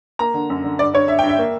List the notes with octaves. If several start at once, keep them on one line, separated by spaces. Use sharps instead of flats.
A#3 A#5
D3
F#2
D3
G2 D5
G2 C#5
G2 E5
G5
G2
E5
A#3